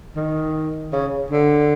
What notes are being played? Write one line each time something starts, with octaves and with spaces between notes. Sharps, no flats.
D#3
C#3
D3